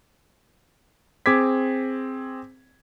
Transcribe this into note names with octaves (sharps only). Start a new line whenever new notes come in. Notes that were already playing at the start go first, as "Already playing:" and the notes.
C4 G#4 D6 G#6 B6